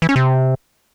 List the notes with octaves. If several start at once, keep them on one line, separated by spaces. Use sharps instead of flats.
E3
C#4
C3